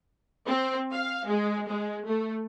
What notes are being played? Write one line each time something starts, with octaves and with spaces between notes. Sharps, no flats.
C4
F5
G#3
G#3
A3